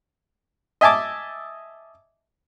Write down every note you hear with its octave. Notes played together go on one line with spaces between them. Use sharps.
D#5 E5 G#5 A5 D6